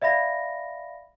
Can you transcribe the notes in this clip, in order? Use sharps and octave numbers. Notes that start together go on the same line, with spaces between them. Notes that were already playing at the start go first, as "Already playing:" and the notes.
D5 E5 F5 B5 A#6